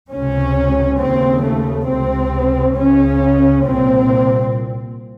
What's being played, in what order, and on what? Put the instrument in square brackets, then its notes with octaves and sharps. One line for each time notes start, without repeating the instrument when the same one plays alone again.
[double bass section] C#2 C3 C#4
D#2 C#3 C4
A3
C#2 C3 C4
C#2 C#3 C#4
C2 A#2 C4